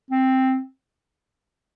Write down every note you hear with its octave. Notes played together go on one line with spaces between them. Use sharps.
C4